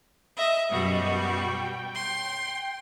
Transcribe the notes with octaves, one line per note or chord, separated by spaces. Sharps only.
D#5 E5
F#2 B2 G3 F#4 D#5
G5
C6